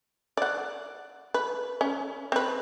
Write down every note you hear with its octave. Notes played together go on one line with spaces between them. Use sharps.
D5 F#5
B4
C#4
C4 B4